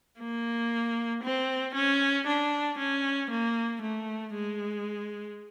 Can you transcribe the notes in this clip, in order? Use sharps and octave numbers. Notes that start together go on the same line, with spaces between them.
A#3
C4
C#4
D4
C#4
A#3
A3
G#3